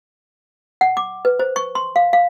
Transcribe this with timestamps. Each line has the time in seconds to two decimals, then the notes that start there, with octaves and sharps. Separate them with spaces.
0.81 F#5
0.97 D6
1.25 B4
1.39 C5
1.56 C#6
1.75 C6
1.96 F5
2.13 F5